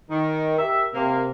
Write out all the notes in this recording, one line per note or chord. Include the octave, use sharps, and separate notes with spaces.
D#3
G4 A#4 E5
C3 A#3